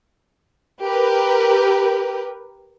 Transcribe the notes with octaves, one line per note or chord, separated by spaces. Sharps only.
G4 A#4 B4